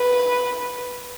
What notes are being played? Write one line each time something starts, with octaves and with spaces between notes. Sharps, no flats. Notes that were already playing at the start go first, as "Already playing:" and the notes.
Already playing: B4